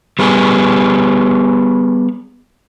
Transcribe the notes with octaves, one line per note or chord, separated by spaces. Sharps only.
G3 B3 G#4